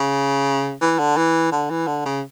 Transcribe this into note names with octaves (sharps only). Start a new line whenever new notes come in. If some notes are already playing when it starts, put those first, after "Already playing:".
Already playing: C#3
E3
D3
E3
D3
E3
D3
C#3